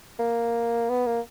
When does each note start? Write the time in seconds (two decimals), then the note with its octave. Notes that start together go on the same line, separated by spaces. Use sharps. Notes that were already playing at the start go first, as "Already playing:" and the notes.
0.19 A#3
0.89 B3
1.07 A#3